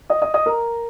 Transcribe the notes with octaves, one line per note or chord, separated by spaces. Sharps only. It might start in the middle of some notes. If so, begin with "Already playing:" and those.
D#5 D#6
D#5 D#6
D#5 D#6
A#4 A#5